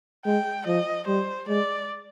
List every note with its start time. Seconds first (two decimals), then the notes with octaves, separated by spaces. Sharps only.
0.26 G#3 G5
0.66 F3 D#5
1.07 G3 C5
1.48 G#3 D5